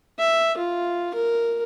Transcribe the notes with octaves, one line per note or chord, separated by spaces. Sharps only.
E5
F4
A#4